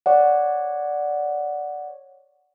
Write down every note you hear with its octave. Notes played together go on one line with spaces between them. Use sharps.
C#5 D5 F#5